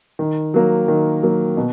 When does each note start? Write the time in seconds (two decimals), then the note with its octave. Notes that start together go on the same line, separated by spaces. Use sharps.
0.19 D#3
0.54 F#3 A#3
0.88 D#3
1.23 F#3 A#3
1.57 B2